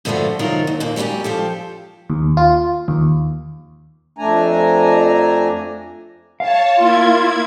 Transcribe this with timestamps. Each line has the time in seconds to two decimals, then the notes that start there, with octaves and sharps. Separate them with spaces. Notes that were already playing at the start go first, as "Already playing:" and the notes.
0.05 G2 D3 F3 A3 D4 F#4
0.39 C3 D#3 F#3 D4 F4 A#4
0.67 D#2
0.80 F2 A#2 A#3
0.96 F#3 G3 B3 C#4 G4
1.24 F3 G4 A4
2.10 D#2
2.37 F4
2.88 D#2
4.18 F2 A3 D4 G#5 A#5
6.40 C#5 F5 A5
6.78 A#3 E4 F4 G#6